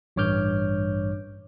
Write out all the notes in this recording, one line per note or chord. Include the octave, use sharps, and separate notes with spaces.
A1 G2 C#5 D6 F6 G6